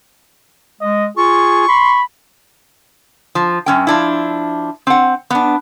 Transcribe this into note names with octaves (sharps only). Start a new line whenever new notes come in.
G#3 D#5
F4 G#4 C#6
B5 C6
F3
F#2 C#4 G5
F3 D4 E4
C4 F#5
B3 D4